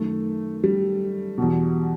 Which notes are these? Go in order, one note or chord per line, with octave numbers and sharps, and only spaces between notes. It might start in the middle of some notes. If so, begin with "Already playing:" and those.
Already playing: F#2 D#3 A3
G3
E2 B2